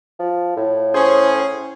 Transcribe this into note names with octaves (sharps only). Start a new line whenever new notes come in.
F3
A2
C#4 G#4 C5